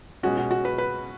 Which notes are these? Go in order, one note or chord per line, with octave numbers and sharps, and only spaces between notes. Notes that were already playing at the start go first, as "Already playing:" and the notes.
B2 G#3 C#4 F#4
F#4
F#4
B4
B4